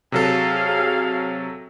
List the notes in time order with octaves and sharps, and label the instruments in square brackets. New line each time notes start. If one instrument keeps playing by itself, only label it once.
[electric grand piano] C3 F#3 A4 [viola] G#4 F5